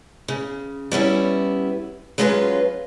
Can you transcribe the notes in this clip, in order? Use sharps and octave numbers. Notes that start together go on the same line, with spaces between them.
C#3
G3 B3 C#4 E4
F#3 G#3 C#4 F4 A4 B4